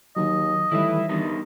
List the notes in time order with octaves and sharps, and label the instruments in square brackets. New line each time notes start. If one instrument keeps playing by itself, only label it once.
[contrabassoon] D#2 [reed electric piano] D#3 F#3 [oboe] D#5
[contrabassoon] A2 [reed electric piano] D#3 E3 G3 [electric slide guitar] E4 B4 E5
[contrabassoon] G2 [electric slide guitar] B3 D#4 A#4